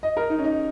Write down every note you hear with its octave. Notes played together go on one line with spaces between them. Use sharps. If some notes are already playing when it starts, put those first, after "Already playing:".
D#5
A#4
D#4
C#4
D#4